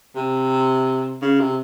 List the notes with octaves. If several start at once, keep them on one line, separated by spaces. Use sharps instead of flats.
C3
C#3
C3